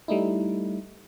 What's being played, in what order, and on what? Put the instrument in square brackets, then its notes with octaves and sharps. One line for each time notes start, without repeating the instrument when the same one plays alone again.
[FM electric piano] G3 A3 D#4 E4